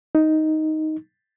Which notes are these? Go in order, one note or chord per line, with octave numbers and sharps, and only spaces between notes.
D#4